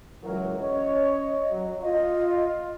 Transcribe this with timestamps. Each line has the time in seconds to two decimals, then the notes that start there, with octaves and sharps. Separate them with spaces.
0.23 C#2 E3 F#3 A#4
0.61 C#4 C#5 D#5
1.50 F#3
1.82 F4 D#5